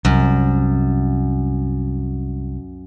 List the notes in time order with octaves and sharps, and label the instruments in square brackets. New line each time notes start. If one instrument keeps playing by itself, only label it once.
[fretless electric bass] C2 [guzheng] F#2